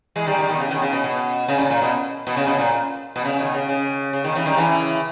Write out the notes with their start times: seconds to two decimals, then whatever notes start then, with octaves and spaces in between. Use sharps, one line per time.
0.16 E3 G#3
0.27 D#3 G3
0.38 D#3 G3
0.49 B2 D#3
0.60 C#3
0.71 B2 D#3
0.82 C#3
0.93 B2
1.04 B2
1.48 C#3
1.59 A#2
1.70 A#2
1.82 B2
2.27 B2
2.37 C#3
2.47 B2
2.59 A#2
3.16 B2
3.25 C#3
3.39 B2 D#3
3.54 C#3
3.69 C#3
4.13 C#3
4.24 B2 D#3
4.35 C#3 E3
4.46 D#3 G3
4.57 C#3 E3